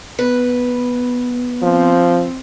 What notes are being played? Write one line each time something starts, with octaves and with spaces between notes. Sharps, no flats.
B3 B4
F3 C4